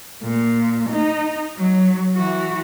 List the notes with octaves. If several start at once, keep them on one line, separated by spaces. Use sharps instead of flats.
A#2
D#4
F#3
E3 F#4